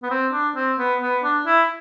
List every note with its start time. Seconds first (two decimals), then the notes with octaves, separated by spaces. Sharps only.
0.03 B3
0.11 C4
0.33 D4
0.56 C4
0.78 B3
1.01 B3
1.23 D4
1.46 E4